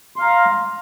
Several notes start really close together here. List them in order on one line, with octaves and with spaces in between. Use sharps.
C6 F5 A#5